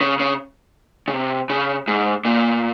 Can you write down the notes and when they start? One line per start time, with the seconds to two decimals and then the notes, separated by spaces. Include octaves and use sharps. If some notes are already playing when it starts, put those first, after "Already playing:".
0.01 C#3
0.19 C#3
1.08 C#3
1.13 C3
1.50 C#3
1.88 G#2
2.25 A#2